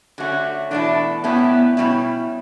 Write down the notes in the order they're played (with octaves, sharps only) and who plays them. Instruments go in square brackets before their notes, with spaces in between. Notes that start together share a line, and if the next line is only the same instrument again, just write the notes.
[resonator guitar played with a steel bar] D3 A3 C#4 [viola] F#4
[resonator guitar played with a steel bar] E2 B2 A3 E4 [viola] D4
[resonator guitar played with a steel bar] A2 G3 C#4 E4 [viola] B3
[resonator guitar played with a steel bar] B2 G3 C#4 E4